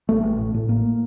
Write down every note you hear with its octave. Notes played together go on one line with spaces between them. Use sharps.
A1 A3
A1
A2
A2
A1 A#3